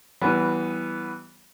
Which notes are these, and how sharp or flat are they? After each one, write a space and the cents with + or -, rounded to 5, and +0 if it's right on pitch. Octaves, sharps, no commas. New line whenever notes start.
E3 -10 G3 -35 B3 +0